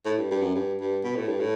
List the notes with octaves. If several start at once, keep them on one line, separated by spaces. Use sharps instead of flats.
A2
G2
G2
F#2
G2
G2
B2
A2
G2
A2